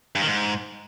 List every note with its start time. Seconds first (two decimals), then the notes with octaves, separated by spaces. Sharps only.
0.16 G2
0.21 D#3
0.27 G#2